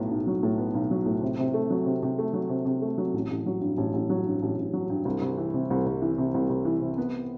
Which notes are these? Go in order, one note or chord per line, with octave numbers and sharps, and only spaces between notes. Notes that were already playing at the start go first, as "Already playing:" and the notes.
Already playing: B1 A2 F#3 B3
B1
F#3
A2
B3
B1
F#3
A2
C3
C3
A3
F#3
C3
C3
A3
F#3
C3
C3
A3
F#3
A1
A1
F#3
G2
A1
A1
F#3
G2
A1
A1
F#3
G2
C2
C2
E3
C3
C2
C2
E3
C3
C2
C2
E3
C3
B3